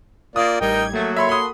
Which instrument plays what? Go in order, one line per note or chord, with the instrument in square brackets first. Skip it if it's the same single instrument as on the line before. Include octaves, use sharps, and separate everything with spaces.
[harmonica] A#3 D5 [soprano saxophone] F4 [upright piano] D#6
[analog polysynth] A1 G3 G#6 [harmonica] D#4 G5 [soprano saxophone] A#4
[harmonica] F#3 [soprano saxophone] A3 [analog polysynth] A#3 F#4 A4
[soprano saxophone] C#5 [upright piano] E5 B5 C6
[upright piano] B5 D#6 [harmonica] C6